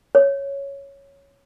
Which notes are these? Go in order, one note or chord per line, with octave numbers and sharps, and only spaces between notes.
C#5